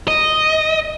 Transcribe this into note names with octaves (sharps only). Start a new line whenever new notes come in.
D#5